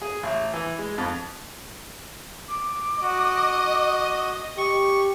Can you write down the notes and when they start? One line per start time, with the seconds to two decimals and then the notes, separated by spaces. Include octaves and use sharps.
0.02 G#4
0.23 A1
0.54 E3
0.79 G#3
0.98 F2
2.48 D6
3.02 F#4 D#5
4.58 G4 C#6